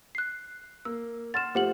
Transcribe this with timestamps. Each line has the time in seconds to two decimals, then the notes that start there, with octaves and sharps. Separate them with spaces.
0.15 F#6 C7
0.85 A#3 E6
1.34 F#5 C6 F6 A6 E7
1.55 F3 A3 G4 C5 F#5 F#7